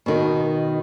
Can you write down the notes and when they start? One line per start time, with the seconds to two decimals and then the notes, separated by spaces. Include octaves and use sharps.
0.06 B2 D#3